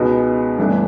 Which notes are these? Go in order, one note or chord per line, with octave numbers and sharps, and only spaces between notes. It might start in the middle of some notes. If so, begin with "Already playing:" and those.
Already playing: C#2 B2 G#3 B3 D#4
G1 G2 E3 A3 D4